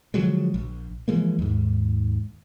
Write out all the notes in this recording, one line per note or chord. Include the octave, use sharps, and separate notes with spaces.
D3 F3 F#3 G#3
A#1
E3 F3 G#3 A#3
D#2 G#2